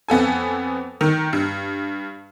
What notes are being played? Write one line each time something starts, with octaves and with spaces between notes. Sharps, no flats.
F2 B3 A4 G#5
D#3
G2